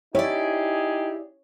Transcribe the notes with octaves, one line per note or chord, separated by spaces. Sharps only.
D#4 E4 G4 G#4 C#5 D5